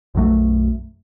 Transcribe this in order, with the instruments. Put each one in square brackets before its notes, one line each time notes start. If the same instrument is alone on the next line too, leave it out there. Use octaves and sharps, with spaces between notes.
[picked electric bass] B1 F#2 F#3 A3